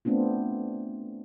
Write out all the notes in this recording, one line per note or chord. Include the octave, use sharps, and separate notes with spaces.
A3 B3 C4 D4 F4